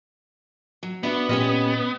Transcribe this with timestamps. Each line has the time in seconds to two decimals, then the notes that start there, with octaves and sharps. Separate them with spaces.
0.83 F#3
1.03 B3 D4 E4 F#4
1.29 A#2 C#4 G4 D#5